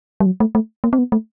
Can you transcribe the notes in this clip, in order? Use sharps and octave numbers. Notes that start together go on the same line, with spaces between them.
G3
F#3
A3
A3
A#3
C4
B3
A3